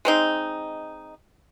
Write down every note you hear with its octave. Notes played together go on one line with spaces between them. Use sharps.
G#3 C4 D#4